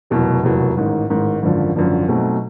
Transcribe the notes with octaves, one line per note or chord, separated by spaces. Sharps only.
F1 E2 B2 F#3 A#3
F1 E2 B2 F#3 A#3
A1 G#2 D#3
A1 G#2 D#3
G#1 F#2 D3 F3
G#1 F#2 D3 F3
B2 F#3 A3 C4 D#4